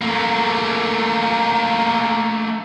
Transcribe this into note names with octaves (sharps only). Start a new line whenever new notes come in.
A3 A#3